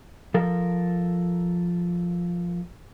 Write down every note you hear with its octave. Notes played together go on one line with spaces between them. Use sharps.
F3 A4 A#4